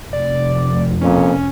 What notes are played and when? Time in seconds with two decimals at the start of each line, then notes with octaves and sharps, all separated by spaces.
0.13 F1 D5
1.01 F2 A#2 C#4